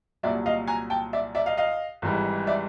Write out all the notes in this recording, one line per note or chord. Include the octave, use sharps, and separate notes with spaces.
C2 A#2 F#3 D5 E5
D#5 F5
G#5 A#5
G5 A5
D5 E5
D5 E5
D#5 F5
D#5 F5
G#1 G#2 E3 G3
D5 E5